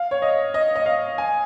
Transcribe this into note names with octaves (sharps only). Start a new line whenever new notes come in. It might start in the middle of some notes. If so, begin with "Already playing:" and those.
Already playing: F5
C#5
D#5
D#5
D#5
F5
G#5